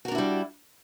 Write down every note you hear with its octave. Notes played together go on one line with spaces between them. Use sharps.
G3 D4 E4 F#4 A#4